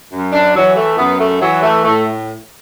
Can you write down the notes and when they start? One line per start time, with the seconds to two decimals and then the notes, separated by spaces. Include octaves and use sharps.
0.13 F#2
0.33 D4
0.55 E3 F#3
0.76 A3
0.98 F#2 B3
1.19 A3
1.41 E3 F#3
1.62 A3
1.84 A2 A3